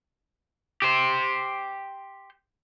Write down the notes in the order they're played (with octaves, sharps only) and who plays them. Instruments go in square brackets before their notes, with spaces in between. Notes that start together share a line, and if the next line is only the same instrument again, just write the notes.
[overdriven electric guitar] G4 C5